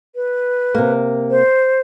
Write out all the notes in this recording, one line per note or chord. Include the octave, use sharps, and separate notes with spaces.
B4
C3 A#3
C5